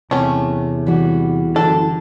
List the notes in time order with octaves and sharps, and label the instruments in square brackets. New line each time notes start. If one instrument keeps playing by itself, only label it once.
[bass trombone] E2 [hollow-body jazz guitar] C3 [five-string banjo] A3 C#4
[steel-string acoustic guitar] E3 G3 F#4
[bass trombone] F#1 [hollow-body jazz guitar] D3 D4 [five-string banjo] A4